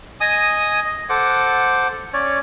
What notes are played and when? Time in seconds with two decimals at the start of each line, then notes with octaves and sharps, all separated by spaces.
0.21 D#5 G#5 D#6
0.85 D#5
1.09 A4 C5 F#5 D6
2.13 C#4 C#5 D5